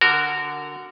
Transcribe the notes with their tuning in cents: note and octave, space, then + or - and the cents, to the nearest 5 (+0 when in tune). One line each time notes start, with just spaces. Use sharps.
D3 +0 F#4 +0 A#4 -15